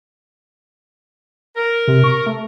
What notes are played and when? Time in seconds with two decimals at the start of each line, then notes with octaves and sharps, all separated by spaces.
1.56 A#4
1.87 C3
2.04 C#6
2.26 A3